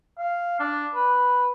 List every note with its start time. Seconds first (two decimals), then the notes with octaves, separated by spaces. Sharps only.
0.18 F5
0.60 D4
0.95 B4